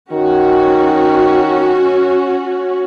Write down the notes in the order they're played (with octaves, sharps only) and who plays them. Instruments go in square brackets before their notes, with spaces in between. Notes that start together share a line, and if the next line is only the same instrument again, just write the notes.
[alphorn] D#3 [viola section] C#4 F#4